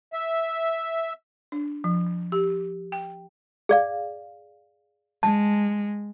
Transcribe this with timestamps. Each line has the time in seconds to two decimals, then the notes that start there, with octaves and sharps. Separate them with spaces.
0.13 E5
1.52 D4
1.84 F3
2.32 G4
2.92 G5
3.69 G#4 D5 F5
5.23 G#3 A5